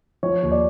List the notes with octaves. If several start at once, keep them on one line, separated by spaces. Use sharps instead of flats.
F3 C#5
D#2
D5